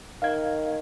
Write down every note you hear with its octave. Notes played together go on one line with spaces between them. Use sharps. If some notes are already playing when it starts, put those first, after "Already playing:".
D#3 F5 G#6